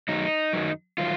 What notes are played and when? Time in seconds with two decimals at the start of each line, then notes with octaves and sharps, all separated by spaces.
0.09 F#2 D#3 F#3 D#4
0.53 F#2 D#3 F#3
0.98 D#3 F#3 F4